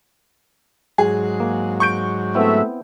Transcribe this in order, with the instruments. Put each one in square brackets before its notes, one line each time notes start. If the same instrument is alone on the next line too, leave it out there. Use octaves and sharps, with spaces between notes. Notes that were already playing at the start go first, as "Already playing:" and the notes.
[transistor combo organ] G#2 F#3 [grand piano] G#4
[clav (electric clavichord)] A#3
[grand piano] C#6 G6 D7
[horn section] A3 E5 [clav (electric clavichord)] B3 C4 E4